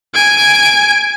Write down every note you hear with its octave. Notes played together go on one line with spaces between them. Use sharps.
G#5 D7